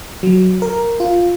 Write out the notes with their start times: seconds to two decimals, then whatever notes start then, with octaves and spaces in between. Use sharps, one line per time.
0.23 F#3
0.62 A#4
1.00 F4